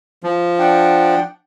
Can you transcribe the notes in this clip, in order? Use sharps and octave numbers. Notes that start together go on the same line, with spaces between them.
F3
D4 F#5 G5